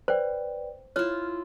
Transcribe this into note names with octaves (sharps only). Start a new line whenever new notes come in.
B4 C5 D5 G5
E4 F4 C#5 F6